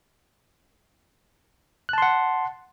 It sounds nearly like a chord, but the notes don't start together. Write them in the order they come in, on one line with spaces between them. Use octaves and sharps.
F#6 A5 C6 F#5